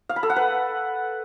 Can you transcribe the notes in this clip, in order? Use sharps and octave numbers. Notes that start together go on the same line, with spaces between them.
F5
B5
A4
F#5
B4